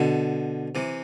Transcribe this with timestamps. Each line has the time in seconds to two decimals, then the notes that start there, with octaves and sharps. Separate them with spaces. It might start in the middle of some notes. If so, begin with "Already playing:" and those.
Already playing: B2 D3
0.75 C3 E3